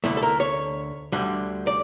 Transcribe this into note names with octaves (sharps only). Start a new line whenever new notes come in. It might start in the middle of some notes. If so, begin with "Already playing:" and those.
D2 D3 A3 E4
A4
A#4
C#5
D2 D3 G3
D5